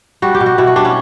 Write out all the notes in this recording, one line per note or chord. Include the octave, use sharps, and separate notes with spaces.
G3 F#4
G4
B2
F#4
B2 E4
F#4
G3 D4
C#4